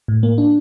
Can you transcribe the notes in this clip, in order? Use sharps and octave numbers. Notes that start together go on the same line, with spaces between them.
A2
A#3
D4